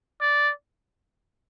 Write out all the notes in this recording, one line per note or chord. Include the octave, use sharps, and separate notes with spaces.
D5